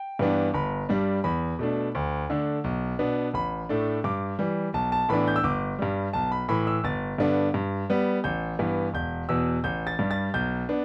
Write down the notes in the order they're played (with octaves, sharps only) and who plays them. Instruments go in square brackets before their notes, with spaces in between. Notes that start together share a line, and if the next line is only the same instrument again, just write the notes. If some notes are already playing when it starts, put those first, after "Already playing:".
Already playing: [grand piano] G5
G2 E3 B3 D4
G1 B5
G2 G3 D4
E2 B5
B2 A3 D4
D2
D3 A3 D4
B1
B2 B3 D4
A1 B5
A2 A3 D4
G2 D6
E3 G3
B1 A5
A5
A2 E3 B3 D4 B5
G6
E6
G1 D6
G2 G3
B1 A5
B5
A2 E3 B5
E6
G1 A6
G2 D3 B3 D4
G2
G3 B3
A1 G6
G2 E3 B3
E1 G6
E2 B2 E6
A1 G6
A6
G2 G3
A6
B1 G6
B3 D4